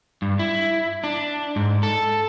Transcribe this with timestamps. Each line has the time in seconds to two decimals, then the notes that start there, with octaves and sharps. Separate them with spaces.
0.22 G2
0.39 E4
1.04 D4
1.56 G#2
1.83 A4